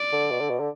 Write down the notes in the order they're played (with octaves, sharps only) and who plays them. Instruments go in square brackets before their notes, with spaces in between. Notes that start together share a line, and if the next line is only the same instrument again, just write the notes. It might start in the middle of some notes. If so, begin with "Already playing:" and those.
Already playing: [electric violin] D5
[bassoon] D3
B2
D3
B2
D3